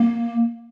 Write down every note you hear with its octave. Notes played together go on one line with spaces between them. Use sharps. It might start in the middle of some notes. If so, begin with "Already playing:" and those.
Already playing: A#3